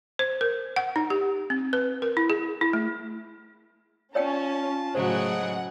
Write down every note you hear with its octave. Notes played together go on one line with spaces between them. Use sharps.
C5
A#4
F#5
D#4
G4
C4
B4
A#4
E4
G#4
E4
A3
C#4 F4 C#5 D5 G5 A5
A2 C#3 F#3 G#3 G#4 C5 F#5